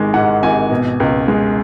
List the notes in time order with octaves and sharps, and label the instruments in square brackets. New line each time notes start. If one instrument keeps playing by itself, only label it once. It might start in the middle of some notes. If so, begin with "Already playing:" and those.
Already playing: [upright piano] G#1 D#3 G#3
G#2 F#5
G#1 G#5
B2
C#2
G#3